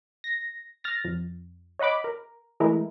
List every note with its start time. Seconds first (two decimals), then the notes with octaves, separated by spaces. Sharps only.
0.24 A#6
0.84 F6 A6 A#6
1.04 F2
1.79 C#5 D#5 F#5 B5 D6
2.04 A#4
2.60 E3 G#3 A3 E4 A#4